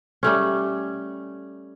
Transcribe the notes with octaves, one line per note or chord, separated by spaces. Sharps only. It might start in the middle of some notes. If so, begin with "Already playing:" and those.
G3 A3 C#4